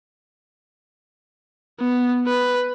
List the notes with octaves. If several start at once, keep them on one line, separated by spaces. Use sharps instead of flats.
B3
B4